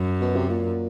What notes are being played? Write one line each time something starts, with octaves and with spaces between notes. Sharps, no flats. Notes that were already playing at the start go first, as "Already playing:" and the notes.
Already playing: F#2
B2
C3
A#2